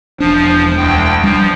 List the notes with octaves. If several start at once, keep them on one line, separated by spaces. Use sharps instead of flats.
E1 F3 D4
D2 G5
F3 G3 D4